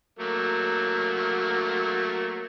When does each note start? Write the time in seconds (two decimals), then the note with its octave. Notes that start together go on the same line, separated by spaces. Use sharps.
0.19 F#3 A3 A#3